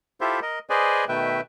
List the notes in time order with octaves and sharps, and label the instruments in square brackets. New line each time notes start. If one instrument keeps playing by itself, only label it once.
[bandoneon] E4 F4 G4 A4 C5 E5
A#4 D#5
G#4 B4 C5 D5 D#5 G#5
B2 D#3 A3 B4 E5 G5